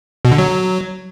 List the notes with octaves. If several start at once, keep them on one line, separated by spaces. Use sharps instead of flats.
B2
D3
F#3